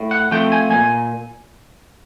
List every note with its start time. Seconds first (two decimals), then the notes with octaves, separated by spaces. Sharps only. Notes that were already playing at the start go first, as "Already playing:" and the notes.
Already playing: A2
0.11 F#5
0.31 F3 A3 C4 G5
0.52 G#5
0.71 A#2 G#5